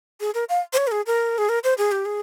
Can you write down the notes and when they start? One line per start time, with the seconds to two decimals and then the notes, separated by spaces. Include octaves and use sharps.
0.20 G#4
0.34 A#4
0.49 F5
0.73 C5
0.77 C#5
0.87 A#4
0.91 G#4
1.06 A#4
1.38 G#4
1.49 A#4
1.64 C5
1.78 G#4
1.92 G4
2.05 G#4